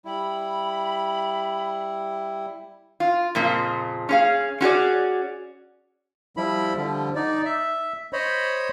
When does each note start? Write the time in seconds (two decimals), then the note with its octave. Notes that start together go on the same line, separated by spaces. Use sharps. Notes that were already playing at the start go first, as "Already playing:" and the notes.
0.05 G3 E4 B5
3.00 F4
3.35 F2 A#2 C#3
4.09 C#4 G#4 F5
4.61 C#4 F#4 G#4 D5
6.37 F3 G3 E4 B5
6.77 D3 F3 G3
7.16 D#4 D5
7.45 E5
8.13 C5 C#5 D#5 B5